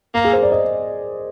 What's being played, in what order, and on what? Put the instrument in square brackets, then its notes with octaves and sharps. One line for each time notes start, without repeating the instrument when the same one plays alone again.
[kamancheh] A#3 [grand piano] A#4
[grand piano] G#4
C5
D5
D#5